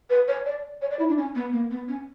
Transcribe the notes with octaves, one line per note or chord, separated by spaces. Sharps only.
B4
C#5
D5
C#5
D5
E4
D4
C#4
B3
A#3
B3
C#4